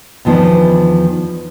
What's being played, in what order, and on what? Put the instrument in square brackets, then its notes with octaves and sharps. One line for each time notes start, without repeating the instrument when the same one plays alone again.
[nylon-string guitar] E2 D#3 F3 B3 D4